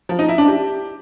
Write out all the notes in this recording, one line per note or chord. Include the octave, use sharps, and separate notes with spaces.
F3
D#4
E4
D4
G4